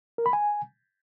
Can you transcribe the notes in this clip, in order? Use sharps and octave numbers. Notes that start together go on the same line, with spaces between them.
A#4
B5
G#5